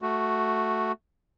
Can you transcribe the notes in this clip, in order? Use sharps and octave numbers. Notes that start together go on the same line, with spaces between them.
A3 F#4